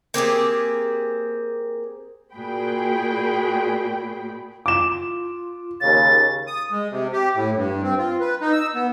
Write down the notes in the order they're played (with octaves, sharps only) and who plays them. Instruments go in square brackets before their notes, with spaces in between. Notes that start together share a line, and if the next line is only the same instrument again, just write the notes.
[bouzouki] A#3 C4 G4 G#4
[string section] A#2 F#4 G#4 G5 B5
[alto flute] F4 [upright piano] D6 E7
[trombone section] D#2 C#3 [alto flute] F5 [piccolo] A6
[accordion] D#6
G#3
C3
G4
A2
G2
C4
F4
B4
D#4
E6
B3